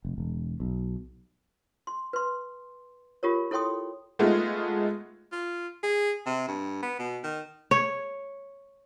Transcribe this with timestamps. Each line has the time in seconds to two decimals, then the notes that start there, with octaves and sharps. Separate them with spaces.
0.05 F1
0.18 E1
0.60 B1
1.87 C6
2.13 B4 C6
3.23 F4 G4 A#4 C#5
3.51 E4 A4 C#5 G5 C6 D#6
4.19 G#3 A3 B3 D#4 F4 G#4
5.32 F4
5.83 G#4
6.26 C3
6.48 G2
6.83 B3
6.99 B2
7.24 D#3
7.71 C#5